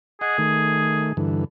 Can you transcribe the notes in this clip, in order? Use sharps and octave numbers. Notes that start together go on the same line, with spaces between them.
G#4 D#5 F#5
D#3 A3
G2 D3 E3